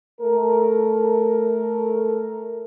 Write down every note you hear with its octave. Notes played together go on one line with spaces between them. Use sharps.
A3 A4 A#4